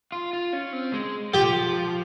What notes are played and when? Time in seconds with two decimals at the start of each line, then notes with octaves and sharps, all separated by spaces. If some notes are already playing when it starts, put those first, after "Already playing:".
0.12 F4
0.33 F4
0.53 C#4
0.73 C4
0.93 G#3
1.34 F3 G4